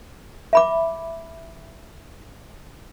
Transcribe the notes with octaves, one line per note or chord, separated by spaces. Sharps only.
E5 B5 D6